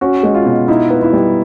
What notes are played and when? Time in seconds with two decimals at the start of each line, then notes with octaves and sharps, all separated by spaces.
0.01 C#4 F#4
0.23 G#3
0.34 F4
0.46 B2
0.68 D#4 E4
0.90 B3
1.02 E4
1.13 G3